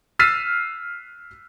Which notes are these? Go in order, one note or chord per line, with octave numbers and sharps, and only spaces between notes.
E6 F6 A6 B6 C7 D#7